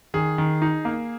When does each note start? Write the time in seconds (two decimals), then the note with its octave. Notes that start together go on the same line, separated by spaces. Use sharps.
0.14 D#3 G#4
0.38 D#3
0.62 D#4
0.85 A#3